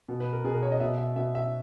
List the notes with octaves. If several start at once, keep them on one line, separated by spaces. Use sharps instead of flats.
B2
B4
A#4
B2 G#4
A#4
C#5
D#5
B2 E5
E5
B2 E5
E5